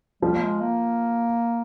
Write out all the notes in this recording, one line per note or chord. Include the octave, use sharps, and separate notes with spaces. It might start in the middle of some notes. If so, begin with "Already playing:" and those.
F3 G3
A#3
G#3
A#3